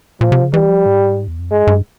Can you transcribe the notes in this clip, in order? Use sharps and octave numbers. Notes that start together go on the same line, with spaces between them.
A#2 F3
C3
C#3
E3 G3
F3
G#2
E2
F2
G2 G#3
G2